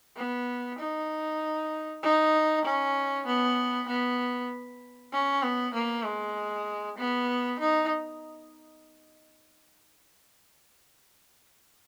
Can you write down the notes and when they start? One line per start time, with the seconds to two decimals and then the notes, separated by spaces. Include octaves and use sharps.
0.16 B3
0.79 D#4
2.03 D#4
2.65 C#4
3.26 B3
3.88 B3
5.12 C#4
5.43 B3
5.74 A#3
6.05 G#3
6.98 B3
7.59 D#4